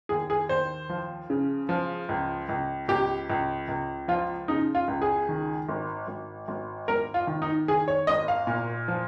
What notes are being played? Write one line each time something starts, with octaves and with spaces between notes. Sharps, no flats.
D#2 G#4
G#4
D#2 C5
F3
C#3
F3
C#2
C#2
C#2 G4
C#2
C#2
F3 F4
C#3 D#4
F4
C#2
G#4
D#3
G#1
G#1
G#1
G#1 A#4
F4
D#3
D#4
D#3 G#4
C#5
G#1 D#5
F5
A#2
F3